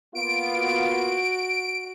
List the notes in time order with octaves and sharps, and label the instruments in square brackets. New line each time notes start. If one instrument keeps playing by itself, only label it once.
[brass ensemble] A#3 B3 F4 [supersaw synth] D7
[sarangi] F#4